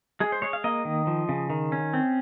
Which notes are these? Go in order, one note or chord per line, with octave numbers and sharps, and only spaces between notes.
G#3 G#4
C5
G#3 C#5
F5
A#3 D#5
D#3
F3
C#3
D#3
C#4
C4